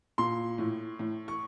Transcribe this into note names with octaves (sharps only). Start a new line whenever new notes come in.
A#2 C6
A2
A2
C#6